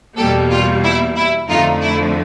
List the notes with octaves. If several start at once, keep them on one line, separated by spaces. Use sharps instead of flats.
E2 B2 G3 A#3 G4 A4
F4 G4
E4
E4
F2 D3 F3 A3 D#4 F4
E4